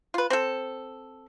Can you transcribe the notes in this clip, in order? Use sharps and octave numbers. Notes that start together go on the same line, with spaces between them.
F4 B4
C4 A4